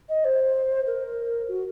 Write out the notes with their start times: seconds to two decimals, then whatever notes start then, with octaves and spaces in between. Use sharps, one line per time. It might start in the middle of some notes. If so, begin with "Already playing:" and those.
0.09 D#5
0.25 C5
0.87 A#4
1.49 F#4